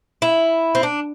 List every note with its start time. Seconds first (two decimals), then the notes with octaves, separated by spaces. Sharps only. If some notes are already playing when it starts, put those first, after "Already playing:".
0.22 E4
0.75 C4
0.83 D4